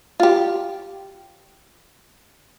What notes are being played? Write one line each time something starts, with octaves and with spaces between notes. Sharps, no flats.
F4 G4